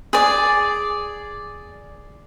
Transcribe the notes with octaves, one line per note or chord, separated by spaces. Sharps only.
G#4 D5